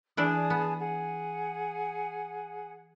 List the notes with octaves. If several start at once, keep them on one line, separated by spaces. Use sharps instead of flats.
E3 D4 E4 G#4 A5 D#6
B3
G#4 F#5